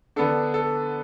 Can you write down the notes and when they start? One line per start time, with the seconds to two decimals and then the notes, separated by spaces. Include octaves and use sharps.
0.16 D3 B3 D4 A4
0.54 A4